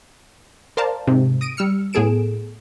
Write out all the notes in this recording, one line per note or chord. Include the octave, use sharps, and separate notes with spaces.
A#4 C5 D5 F5 A5 A#5
G#2 C3
D#6 A#6 D7 D#7
G3 E6 F6 C#7
A2 B3 G#4 A4 D7 E7